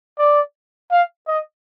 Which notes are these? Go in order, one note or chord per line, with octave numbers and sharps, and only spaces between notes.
D5
F5
D#5